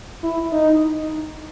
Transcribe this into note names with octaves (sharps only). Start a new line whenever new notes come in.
E4
D#4